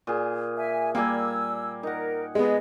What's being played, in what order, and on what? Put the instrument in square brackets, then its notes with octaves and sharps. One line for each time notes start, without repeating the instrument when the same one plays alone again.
[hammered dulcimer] A#2 G#4
[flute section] E5 G#5
[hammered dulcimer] G3 D5 G#5 [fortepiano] A#3 [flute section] E6
[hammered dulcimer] D#4 F#5 [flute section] A#4
[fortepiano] G#3 B3 [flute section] G#4 D#5